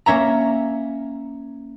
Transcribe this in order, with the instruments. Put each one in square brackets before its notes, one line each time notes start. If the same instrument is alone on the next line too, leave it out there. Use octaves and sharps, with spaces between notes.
[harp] A#3 C#4 E5 A#5